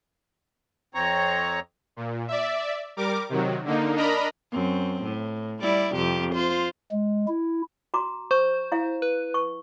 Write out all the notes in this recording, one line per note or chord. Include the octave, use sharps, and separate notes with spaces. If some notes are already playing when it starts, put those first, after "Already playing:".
F2 C4 C#5 A#5
A#2
D5 E5
G3 A#4 D6
C3 D#3 F#3
D3 A#3 D#4
D4 A#4 D#5 A#5 B5
F#2 C4
A2
G3 E4 D5
F2 C3 G4
F4 C5
G#3
E4
F#4 A#5 D6
C5 C#6
E4 F5
B4
C#6